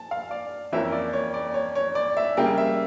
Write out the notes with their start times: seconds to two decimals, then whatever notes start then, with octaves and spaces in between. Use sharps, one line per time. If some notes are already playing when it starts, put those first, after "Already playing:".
Already playing: A5
0.11 F5
0.31 D5
0.72 F2 E3 A#3 C#4 E5
0.92 D5
1.13 C#5
1.34 D5
1.54 C#5
1.75 C#5
1.95 D5
2.17 E5
2.37 C#3 G3 A#3 G5
2.58 E5